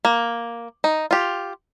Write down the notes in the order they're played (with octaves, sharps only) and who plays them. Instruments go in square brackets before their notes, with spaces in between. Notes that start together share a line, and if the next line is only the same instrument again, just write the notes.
[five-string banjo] A#3
D#4
F4 G4